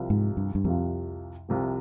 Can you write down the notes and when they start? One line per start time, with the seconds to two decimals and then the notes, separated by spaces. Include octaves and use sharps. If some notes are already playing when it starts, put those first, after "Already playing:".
Already playing: C2 C3 F3
0.10 G#2
0.37 G2
0.55 G2
0.64 C2 F2 C3 F3
1.49 C2 C3 F3